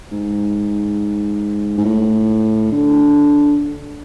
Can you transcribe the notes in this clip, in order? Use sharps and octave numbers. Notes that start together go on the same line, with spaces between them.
G#2
G#2
A2
D3